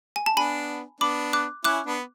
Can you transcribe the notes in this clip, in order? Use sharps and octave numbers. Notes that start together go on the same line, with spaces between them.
G#5
A5
B3 D4 G#5 B5
B3 D4 B5 D6
D6 F#6
C#4 E4 D6 F#6
B3 D4